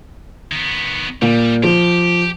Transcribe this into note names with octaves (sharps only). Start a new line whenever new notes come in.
D#3 B3
A#2 G3
F3 G4